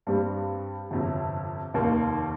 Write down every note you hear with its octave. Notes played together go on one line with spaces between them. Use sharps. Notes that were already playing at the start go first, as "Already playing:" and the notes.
G2 G3 C4
G1 F2 C3
F1 D#2 D#3 A#3